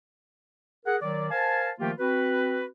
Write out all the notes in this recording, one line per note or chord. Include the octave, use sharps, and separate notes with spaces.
G#4 A#4 F#5
D#3 F#3 D5
A#4 C5 F5 G#5 A5
D#3 F3 A3 A#3 F4 G4
C4 F#4 B4